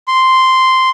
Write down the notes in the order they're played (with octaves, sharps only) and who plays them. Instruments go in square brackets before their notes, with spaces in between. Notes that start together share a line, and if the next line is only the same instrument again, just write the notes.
[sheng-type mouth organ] C6